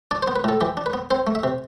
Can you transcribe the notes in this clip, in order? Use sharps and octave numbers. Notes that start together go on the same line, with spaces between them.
D4 D5
C5
B3
B4
A2 A4
E3 G4
D4
B4
B3
C4 C5
A3
E5
C3